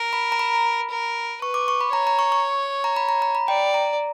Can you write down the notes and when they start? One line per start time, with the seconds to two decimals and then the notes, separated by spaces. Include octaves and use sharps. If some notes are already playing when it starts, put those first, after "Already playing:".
Already playing: A#4
0.13 B5
0.32 A#5
0.39 B5
0.90 A#4
1.42 B4 C#6
1.54 D6
1.68 C#6
1.81 B5
1.93 C#5 A#5
2.07 A#5
2.19 C#6
2.32 C#6
2.84 A#5
2.96 B5
3.09 A#5
3.22 A#5
3.35 B5
3.48 D5 G5
3.74 A#5